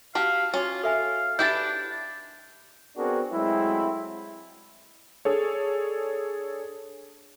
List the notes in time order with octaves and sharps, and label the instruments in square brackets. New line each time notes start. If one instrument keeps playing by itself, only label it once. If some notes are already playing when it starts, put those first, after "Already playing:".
[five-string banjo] F#4 G4 [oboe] F5 [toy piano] A5
[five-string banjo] C#4 [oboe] F4 [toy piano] F#4 D6
[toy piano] A4 E5 G#5 [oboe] F5
[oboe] D4 [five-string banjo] E4 G4 B4 [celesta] G6 A6
[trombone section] B3 C4 D4 F#4 G#4 A#4
F#3 G#3 A3 C4 E4
[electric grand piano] D4 G#4 A4 C#5